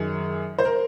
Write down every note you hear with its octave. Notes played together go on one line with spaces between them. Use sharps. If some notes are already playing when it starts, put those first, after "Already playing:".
Already playing: F#2 D#3 G#4
C5
A#4